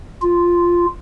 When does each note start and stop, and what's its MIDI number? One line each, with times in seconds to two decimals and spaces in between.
0.22 0.86 65